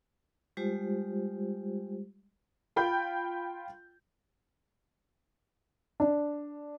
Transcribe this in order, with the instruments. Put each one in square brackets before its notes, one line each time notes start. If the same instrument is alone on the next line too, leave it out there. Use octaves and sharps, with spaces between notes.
[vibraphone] G3 G#3 F4 G4 C5
[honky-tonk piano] F4 G5 B5 G6
[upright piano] D4